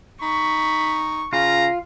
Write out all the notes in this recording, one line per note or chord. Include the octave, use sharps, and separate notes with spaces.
D#4 B5 C#6
C#3 F4 A#5